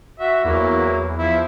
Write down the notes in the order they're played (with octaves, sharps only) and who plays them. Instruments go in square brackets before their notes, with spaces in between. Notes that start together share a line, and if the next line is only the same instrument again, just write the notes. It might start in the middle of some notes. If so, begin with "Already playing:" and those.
[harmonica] F#4 E5
[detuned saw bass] E2 [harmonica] F#3 A#3 E4
[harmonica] F3 E4